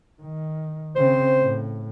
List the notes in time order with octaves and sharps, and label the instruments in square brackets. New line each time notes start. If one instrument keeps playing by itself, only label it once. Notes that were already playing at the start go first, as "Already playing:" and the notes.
[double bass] D#3
[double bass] C#3 C4 [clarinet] C5
[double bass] A2